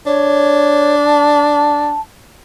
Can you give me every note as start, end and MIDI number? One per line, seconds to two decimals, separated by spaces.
0.06 1.94 62
0.06 0.95 73
1.04 2.00 81